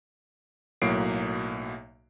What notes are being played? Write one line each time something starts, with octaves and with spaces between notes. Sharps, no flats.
B1 A2 F#3 A#3 C7 D7